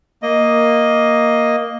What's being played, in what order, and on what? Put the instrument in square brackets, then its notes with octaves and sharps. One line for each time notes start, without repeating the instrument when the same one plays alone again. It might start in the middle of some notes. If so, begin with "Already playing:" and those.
[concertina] A#3 D#5